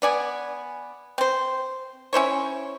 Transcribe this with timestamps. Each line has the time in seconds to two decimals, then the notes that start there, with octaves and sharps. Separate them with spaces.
0.02 B3 D5 G#5
1.18 C4 C5
2.13 C#4 E4 C5 C#5